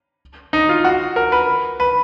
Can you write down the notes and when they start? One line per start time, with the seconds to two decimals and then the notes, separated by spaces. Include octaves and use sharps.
0.53 D#4
0.69 F4
0.85 F#4
1.16 A#4
1.32 B4
1.80 B4